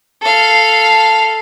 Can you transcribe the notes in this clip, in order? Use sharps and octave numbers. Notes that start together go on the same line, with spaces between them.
A4 F5